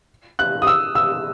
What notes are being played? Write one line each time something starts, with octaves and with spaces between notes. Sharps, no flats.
F#6
D#6
E6
E6